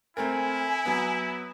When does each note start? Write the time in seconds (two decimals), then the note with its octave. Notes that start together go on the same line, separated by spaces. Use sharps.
0.17 A3 C4 E4 A#4 G#5
0.85 F#3 B3